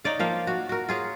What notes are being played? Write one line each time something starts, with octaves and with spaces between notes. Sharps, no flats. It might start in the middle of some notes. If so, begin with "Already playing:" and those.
D#4 C#5 D5 F5
F3 A#3 F5 G5
F#4
F#4 A#4
F4 G#4 C#5